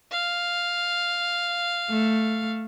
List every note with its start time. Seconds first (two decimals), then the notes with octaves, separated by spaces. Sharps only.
0.11 F5
1.90 A3